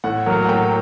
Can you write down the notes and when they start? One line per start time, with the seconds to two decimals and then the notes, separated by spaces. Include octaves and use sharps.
0.04 A2 F#5
0.26 F#3 A#3
0.44 F#5
0.49 A2 G5